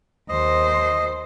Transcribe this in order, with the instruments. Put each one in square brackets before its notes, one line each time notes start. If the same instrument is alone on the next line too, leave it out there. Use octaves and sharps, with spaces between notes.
[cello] D#2 C5 [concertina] D#5